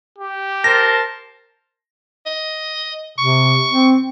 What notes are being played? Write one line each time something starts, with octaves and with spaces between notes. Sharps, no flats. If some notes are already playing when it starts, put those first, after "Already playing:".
G4
A#4 C5 A5 A#6
D#5
C3 C#6
C4